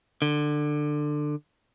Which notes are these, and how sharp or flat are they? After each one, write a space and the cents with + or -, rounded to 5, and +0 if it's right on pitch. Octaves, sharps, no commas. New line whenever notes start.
D3 +20